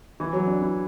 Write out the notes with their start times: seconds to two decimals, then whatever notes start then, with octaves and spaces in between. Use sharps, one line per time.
0.20 E3
0.33 F#3
0.47 D4
0.61 E4